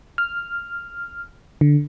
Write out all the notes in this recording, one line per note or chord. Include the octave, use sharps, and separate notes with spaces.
F6
D3